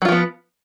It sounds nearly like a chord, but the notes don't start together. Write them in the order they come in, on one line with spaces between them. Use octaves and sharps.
F#3 F4 F3 B3